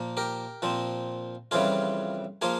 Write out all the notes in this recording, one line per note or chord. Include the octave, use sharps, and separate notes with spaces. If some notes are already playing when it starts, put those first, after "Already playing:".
Already playing: A#2 F3 A#3
G4 A#4
A#2 F3 C4
F2 C#3 E3 G3 F4 G#4
F3 A#3 F4 G#4